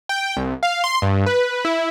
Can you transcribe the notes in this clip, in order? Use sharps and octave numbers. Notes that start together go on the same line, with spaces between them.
G5
C2
F5
C6
G2
B4
E4